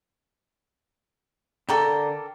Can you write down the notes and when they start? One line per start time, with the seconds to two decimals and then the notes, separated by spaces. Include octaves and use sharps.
1.69 D3 A4 A#4 G5 A#5 D6